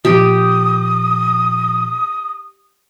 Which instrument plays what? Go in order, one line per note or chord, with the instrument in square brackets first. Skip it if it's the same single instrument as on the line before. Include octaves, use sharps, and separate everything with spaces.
[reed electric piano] A#2 F3 D6 [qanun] G4 [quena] D#6